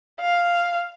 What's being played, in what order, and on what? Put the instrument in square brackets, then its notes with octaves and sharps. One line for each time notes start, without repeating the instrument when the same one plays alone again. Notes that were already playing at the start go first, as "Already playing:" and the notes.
[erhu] F5